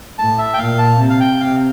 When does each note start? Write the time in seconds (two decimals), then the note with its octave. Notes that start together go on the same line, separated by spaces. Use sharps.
0.18 A2 A5
0.38 E5
0.54 G5
0.58 A#2 F5
0.79 A5
0.99 C3
1.10 F5
1.20 G5
1.40 C3 F5